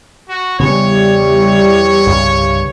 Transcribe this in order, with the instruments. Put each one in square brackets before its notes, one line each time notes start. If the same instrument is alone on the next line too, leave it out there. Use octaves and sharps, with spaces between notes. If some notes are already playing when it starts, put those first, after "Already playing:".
[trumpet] F#4
[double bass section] E2 E3 G3 [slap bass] C#3 B3 [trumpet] C#5
[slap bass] C2 G2 C#3